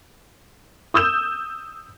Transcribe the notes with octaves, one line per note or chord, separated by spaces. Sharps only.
D#6 E6 G6 E7